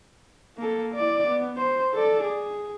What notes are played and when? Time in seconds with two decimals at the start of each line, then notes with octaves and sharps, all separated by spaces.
0.58 A#3 A4
0.95 E4 D5
1.28 B3
1.57 C5
1.95 A4 D5
2.24 G#4